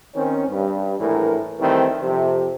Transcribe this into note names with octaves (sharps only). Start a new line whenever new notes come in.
D#3 C4 C#4
G2
A#1 A2 E3 A#4
D#3 E3 G3 A3 C4
F2 C3